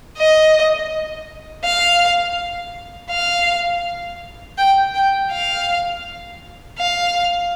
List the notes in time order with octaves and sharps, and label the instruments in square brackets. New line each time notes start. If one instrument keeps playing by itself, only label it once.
[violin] D#5
F5
F5
G5
G5
F5
F5